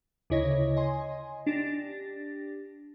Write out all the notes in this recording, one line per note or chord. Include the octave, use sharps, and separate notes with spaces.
D2 C#3 E4 C#5 D#5 A#6
D#5 G#5 C6
D4 G4 A6 A#6